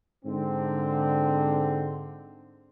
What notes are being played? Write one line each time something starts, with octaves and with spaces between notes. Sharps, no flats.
G#2 D3 C4